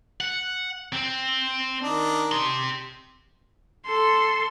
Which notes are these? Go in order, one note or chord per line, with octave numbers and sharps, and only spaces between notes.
F#5
C4
D#3 D4 D#4
G4 C6
A4 C6